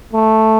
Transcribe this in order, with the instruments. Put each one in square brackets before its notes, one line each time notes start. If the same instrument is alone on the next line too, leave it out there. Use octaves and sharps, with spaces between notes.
[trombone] A3